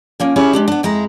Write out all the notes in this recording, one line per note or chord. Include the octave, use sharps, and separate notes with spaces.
F3 A#3 C#4
C#4 E4 G4 G#4 C#5
G#3 D4 G4
B3 D4
F2 G#3 E4 A#5